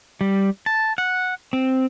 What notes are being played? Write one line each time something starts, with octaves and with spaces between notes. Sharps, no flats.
G3
A5
F#5
C4